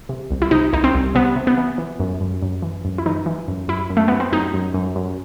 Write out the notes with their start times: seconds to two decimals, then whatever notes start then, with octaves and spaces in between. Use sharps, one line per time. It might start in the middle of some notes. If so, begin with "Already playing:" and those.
0.09 C3
0.31 C2
0.42 E4
0.51 C3 D#4
0.73 C2 D#4
0.84 C4
0.94 C2
1.15 C3 B3
1.36 C3
1.47 B3
1.57 E3
1.78 E3
2.00 F#2
2.21 F#2
2.42 F#2
2.62 E3
2.85 F#2
2.98 E4
3.06 E3 D#4
3.26 E3
3.48 F#2
3.68 F#2 E4
3.90 F#2
3.97 A3
4.08 F#2 B3
4.20 C4
4.32 F#2 D#4
4.54 F#2
4.74 F#2
4.96 F#2